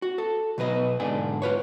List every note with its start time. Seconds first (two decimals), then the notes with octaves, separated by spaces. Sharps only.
0.02 F#4
0.18 A4
0.58 B2 F#3 B4 D#5
1.00 B1 G#2 D3 D5 G#5
1.42 F4 B4 C#5